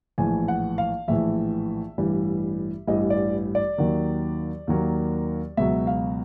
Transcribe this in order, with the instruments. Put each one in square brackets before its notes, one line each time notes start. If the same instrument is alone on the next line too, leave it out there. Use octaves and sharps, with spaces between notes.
[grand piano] A#1 A2 E3 G#5
F#5
F5
A#1 A2 E3 E5
A1 G2 E3 G3
A1 G2 E3 G3 D#5
D5
D5
D#2 D#3 F#3 A#3
D#2 D#3 F#3 A#3
C#2 B2 F#3 E5
F5